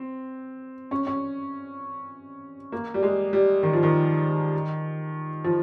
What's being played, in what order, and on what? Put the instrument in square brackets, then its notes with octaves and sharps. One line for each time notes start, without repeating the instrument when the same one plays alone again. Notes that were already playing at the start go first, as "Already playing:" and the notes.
Already playing: [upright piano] C4
C#4
C#4
A#3
G3
G#3
G3
D#3
F3
D#3
F3